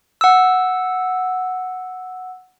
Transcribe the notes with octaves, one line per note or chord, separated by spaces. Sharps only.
F#5 E6